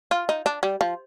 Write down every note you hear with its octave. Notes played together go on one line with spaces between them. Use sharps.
F4
D#4
D4
G3
F3